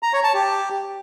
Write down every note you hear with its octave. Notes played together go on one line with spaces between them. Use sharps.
A#5
C#5
A5
G4